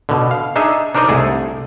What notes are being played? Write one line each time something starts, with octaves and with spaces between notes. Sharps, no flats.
B2 D3
F5
D4 D#4 G#4 D#5 E5
D4 D#4 A#4 C5 D5 D#5
C2 A3 G#4 A4